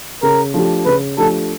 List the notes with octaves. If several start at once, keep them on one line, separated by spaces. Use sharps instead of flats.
C#3 A#4
F3 A3 D4 G4
C#3 B4
F3 A3 D4 G4 A4